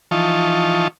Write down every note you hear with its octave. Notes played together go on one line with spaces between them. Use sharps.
E3 F3 D#4 F4 A5 C#6